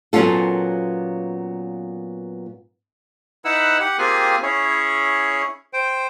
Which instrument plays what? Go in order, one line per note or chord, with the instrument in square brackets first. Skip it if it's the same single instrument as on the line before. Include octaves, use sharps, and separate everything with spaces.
[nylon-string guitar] A#2 F#3 B3 C#4 F4 A4
[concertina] D#4 E4 B4 F#5 E6
G4 F#5
A#3 C4 F4 G4 G#4 G#5
C#4 E4 G#4 C#5
C5 G5